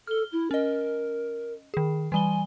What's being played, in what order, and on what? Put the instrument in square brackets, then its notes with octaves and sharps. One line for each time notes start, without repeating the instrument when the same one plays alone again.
[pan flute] A4 [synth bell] F6 G7
[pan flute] E4
[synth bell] C#4 D#5 [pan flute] A#4
[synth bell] D#3 G#4
[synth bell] E3 G3 G7 [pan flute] G#5